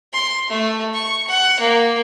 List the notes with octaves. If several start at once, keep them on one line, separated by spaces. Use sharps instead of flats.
C6
A3
C#6
F#5
A#3